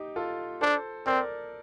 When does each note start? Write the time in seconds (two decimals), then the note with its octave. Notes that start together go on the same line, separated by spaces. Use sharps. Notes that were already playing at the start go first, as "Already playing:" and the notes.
Already playing: D#4 G4
0.16 F4 A4
0.61 D4 A4 C5
1.06 C4 A#4 D5